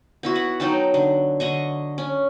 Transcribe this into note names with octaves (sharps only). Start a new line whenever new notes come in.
B3 E4 F#4
F#5
F#3 D#4 G5 A5
D3
D3 D#5 C#6
C#4